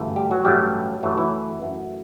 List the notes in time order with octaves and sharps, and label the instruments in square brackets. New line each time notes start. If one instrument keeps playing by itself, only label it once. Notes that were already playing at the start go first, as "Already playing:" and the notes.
Already playing: [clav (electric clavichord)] G1 F#2 E3 A3
G3 G4
F#3 F#4
A1 G2 F#3 G3 A3 G4
F#2 E3 F#3 A3 F#4
E3 E4
F#2 E3 A3